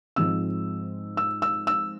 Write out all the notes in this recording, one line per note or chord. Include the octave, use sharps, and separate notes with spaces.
G#2 F3 G#3 C4 E6
E6
E6
E6